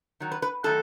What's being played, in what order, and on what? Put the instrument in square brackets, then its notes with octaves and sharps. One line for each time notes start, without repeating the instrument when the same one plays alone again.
[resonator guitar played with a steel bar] D#3 F#3
B4
B4
D#3 F#3 A3 A4